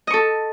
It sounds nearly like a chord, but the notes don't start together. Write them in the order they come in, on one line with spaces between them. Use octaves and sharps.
D#5 C#6 A4